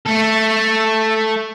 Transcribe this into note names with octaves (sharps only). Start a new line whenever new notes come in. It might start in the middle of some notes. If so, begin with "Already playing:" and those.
A3 A4